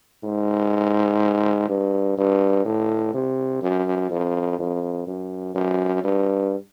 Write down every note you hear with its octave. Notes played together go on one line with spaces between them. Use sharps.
G#2
G2
G2
A2
C3
F#2
F2
F2
F#2
F#2
G2